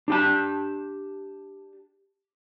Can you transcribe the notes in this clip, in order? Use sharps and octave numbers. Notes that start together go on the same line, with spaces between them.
D4 G4 A5